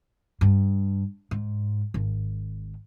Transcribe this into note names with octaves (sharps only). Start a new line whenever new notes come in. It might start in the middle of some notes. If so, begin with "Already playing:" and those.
G2
G#2
G#1